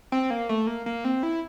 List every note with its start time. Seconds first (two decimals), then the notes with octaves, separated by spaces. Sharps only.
0.12 C4
0.30 A#3
0.49 A3
0.67 A#3
0.86 A#3
1.04 C4
1.23 E4